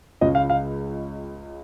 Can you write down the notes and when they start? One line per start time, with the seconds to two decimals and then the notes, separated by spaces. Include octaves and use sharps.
0.21 C#2 C#3 G#3 C#4 F4 D#5
0.35 F5
0.50 F5